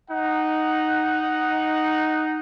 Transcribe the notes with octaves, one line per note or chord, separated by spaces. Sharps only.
D#4 F#5